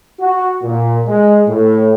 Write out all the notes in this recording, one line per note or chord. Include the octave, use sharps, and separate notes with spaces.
F#4
A#2
G#3
A2